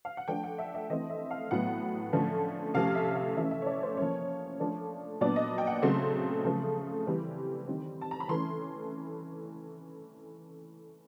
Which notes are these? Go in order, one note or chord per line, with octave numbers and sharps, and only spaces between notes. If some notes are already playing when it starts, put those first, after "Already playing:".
F5
F#5
F3 A3 D4 G5
F#5
E5
E5
E3 A3 C4 D#5
E5
F5
A2 F#3 B3 F#5
D3 F3 A3 C#4
C3 F3 A3 C#4 F5
E5
F5
E3 A3 C#4 E5
E5
C#5
D5
C5
F3 A#3 C#4 C#5
F3 A3 D4
A#2 F#3 B3 D4 D5
D#5
G5
F#5
C#3 F#3 A3 C4 C6
C#3 F3 A3
E3 G3 C4
D#3 G3 C4
A5
A#5
B5
E3 A3 C#4 C6